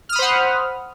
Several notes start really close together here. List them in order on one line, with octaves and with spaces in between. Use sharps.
F6 D#6 B5 C5 F#5